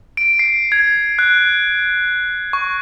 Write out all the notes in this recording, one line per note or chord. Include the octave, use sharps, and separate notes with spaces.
D7
C7
G#6
F#6
C#6